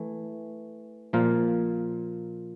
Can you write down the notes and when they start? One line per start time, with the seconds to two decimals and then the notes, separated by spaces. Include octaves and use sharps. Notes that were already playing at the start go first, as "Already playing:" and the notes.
Already playing: E3 A3
1.13 A#2 F3 A#3 F4 A#4